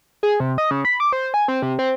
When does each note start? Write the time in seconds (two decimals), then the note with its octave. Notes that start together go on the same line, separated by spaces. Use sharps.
0.23 G#4
0.40 C3
0.58 D#5
0.71 C#3
0.85 B5
1.00 D6
1.13 C5
1.34 G#5
1.48 C4
1.62 C3
1.79 C4